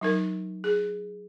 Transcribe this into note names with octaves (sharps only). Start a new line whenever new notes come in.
F#3 D#4 A#4
G#4